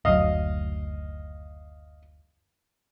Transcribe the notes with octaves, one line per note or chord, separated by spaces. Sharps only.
F#1 D2 F#3 D#5 F5 D#6